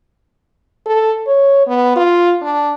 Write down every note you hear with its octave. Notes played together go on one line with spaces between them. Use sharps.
A4
C#5
B3
F4
D4